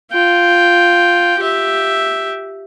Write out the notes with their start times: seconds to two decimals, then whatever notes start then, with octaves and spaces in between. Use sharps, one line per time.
0.12 F4 G5
1.39 G4 E5